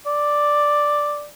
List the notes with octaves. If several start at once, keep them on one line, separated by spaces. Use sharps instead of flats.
D5